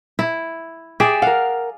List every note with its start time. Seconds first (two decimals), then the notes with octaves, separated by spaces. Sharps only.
0.19 E4
1.00 G4 G#4 D5 E5
1.22 A#4 F5 F#5